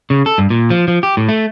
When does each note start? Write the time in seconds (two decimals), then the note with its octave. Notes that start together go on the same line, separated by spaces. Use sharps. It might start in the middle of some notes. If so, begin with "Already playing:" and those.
0.10 C#3
0.26 A4
0.38 G2
0.50 A#2
0.70 F3
0.88 F3
1.03 G4
1.17 A2
1.29 A3